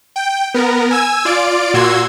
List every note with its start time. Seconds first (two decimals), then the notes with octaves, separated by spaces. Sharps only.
0.16 G5
0.54 B3 A#4
0.91 G#5 E6 G#6
1.25 F4 D5 D7
1.74 A#2 F#4 C6 E6 G#6